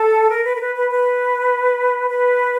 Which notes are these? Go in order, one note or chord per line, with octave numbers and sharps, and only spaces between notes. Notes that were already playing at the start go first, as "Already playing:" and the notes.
Already playing: A4
A#4
B4
A#4
B4
B4
B4
B4